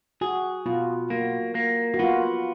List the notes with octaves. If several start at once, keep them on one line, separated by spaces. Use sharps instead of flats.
F#4 G#4
B2 F4
A#3 F#4
A#3
F#4
B3 F4